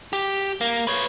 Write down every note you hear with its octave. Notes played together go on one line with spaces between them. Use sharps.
G4
A#3
B4 C#5